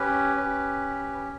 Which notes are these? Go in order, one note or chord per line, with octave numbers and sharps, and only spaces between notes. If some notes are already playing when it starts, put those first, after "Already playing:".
Already playing: C#4 G4 B4
C#4 G4